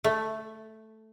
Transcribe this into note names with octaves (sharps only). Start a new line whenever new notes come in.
A3